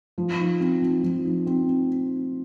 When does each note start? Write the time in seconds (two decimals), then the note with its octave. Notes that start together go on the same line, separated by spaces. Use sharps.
0.18 F3
0.38 D#4
0.60 C4
0.82 F3
1.03 F3
1.25 D#4
1.46 C4